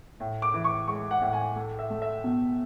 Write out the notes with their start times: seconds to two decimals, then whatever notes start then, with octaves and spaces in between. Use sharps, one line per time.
0.20 A2
0.42 D6
0.54 E3
0.64 C#6
0.88 G#3 C#6
1.11 F#5
1.22 A2
1.33 G#5
1.56 A3
1.79 E5
1.90 A3
2.02 E5
2.24 B2